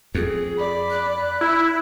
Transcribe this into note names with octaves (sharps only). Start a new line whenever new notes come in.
F2 G#4
D5 B5
F#6
E4 B5